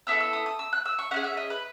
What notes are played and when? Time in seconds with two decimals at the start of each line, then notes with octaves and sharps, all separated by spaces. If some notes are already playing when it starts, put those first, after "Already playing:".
0.07 B3 E4 A4 E6
0.20 E6
0.33 D#6
0.46 D#6
0.59 E6
0.73 F#6
0.85 E6
0.99 C#6
1.11 C#4 E4 G#4 F#5
1.24 E5
1.37 D#5
1.50 B4